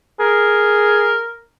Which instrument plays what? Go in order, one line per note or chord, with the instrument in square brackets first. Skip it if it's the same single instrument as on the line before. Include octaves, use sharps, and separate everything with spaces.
[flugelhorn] G#4 [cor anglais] A#4